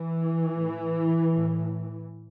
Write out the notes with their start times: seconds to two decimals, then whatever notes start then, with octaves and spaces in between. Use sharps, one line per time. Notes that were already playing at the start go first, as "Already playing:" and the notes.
Already playing: E3
0.54 A2
1.34 A2